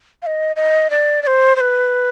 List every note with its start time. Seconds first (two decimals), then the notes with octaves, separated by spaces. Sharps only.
0.22 F5
0.26 D#5
0.56 D#5
0.90 D5
1.23 D5
1.27 C5
1.56 C5
1.61 B4